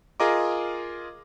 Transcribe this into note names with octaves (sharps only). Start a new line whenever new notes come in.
F4 G#4 A#4 D#5 A#5 D6